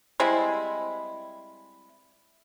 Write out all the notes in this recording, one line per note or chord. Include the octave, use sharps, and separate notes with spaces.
G3 G#3 C4 E4